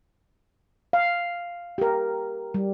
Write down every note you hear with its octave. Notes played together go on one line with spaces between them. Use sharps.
F5
G4 A#4
G3